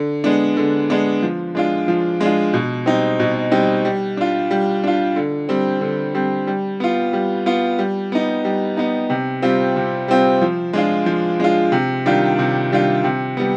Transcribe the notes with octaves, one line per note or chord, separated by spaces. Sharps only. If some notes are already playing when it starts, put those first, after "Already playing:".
Already playing: D3
G#3 B3 D4
D3
G#3 B3 D4
F3
G#3 D4 F4
F3
G#3 D4 F4
B2
G3 C4 D#4
B2
G3 C4 D#4
G3
D4 F4
G3
D4 F4
D3
G3 C4
D3
G3 C4
G3
B3 F4
G3
B3 F4
G3
B3 D#4
G3
B3 D#4
C3
G3 C4 F4
C3
G3 C4 F4
F3
G#3 D4 F4
F3
G#3 D4 F4
C3
D#3 G3 D4 F4
C3
D#3 G3 D4 F4
C3
G3 B3